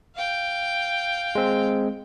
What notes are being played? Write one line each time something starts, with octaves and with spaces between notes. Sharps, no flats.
F5 G5
G#3 C4